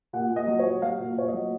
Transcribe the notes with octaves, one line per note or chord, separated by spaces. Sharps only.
A#2 F#5
A#2
D#5
F#3
C#5
F#3
F#3 F5
A#2
A#2 C#5
D#5
F#3